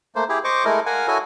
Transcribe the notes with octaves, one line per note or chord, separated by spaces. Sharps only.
A3 A#3 C5
E4 G4 G#4
C5 D#5 C#6 D6
G#3 A3 E4 A#4 D#5
A#4 F5 F#5 G#5
E4 F#4 A4 C#5 D#5 G#5